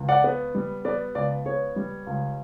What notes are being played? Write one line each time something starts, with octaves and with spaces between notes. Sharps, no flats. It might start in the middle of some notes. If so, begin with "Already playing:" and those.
Already playing: C#2
D5 F#5
B3
G3
B3 D5
C#2 D5
B3 C#5
G3
C#2